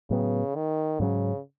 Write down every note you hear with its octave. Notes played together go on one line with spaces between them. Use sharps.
A2 C#3 F#3 B3
D#3
G#2 C#3 F#3 C#4